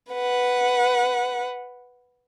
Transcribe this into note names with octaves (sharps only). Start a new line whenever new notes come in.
B4 F#5